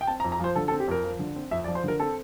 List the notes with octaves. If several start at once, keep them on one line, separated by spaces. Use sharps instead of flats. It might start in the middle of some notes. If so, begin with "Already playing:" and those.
G5
C4 A5
A#5
F2
A#5
F3 C5
D3 A4
A4
C4
G4
F2 A#4
F3
D3
C4
F2 E5
D5
F3
C5
D3 A#4
C4 A4